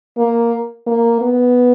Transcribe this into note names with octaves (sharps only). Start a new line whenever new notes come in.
A#3
A#3
B3